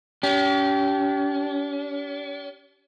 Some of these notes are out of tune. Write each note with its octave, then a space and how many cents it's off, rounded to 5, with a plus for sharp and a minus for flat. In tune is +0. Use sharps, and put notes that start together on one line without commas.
C#4 +45 G4 -25